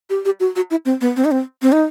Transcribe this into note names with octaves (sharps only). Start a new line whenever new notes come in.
G4
G4
F#4
F#4
E4
C4
B3
C4
D#4
C4
C4
D#4